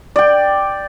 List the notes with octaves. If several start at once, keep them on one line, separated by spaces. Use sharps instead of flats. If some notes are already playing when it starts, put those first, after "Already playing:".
D5 G5